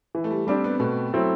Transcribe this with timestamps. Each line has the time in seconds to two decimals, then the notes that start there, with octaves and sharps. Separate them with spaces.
0.15 E3
0.24 A3
0.31 G3
0.47 G3 C4 D4 G4
0.64 B3
0.80 B2 A3
1.13 F#3 C4 E4 A4